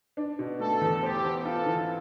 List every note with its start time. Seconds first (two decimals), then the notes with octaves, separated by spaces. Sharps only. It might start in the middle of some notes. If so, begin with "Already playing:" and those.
0.17 D4
0.39 B2
0.60 A3 A4
0.81 E2
1.02 G4 C5
1.24 B3
1.45 F4 A4
1.66 E3